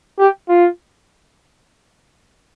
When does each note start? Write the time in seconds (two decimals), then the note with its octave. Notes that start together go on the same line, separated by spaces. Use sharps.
0.19 G4
0.49 F4